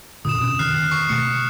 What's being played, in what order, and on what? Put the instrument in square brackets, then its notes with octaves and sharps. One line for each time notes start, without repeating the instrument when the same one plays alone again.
[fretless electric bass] F#2 A#2 D3 [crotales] D#6 E7
[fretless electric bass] F2 B2 C#4 [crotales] D#6
[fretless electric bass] D3 D#3 [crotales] F6 F#6 C7
[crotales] C#6 C7
[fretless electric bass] B2 A3 [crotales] C#7